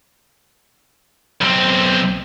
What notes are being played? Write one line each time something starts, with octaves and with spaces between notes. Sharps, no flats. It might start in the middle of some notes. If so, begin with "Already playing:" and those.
B1 C4